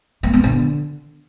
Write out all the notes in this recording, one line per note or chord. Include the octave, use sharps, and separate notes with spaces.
A#3
B3
D3